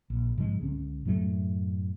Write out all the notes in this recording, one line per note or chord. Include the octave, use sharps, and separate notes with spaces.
A#1
G#2 C#3 F3 G#3
C#2 D3 C#4
F#2 A2 F#3 A3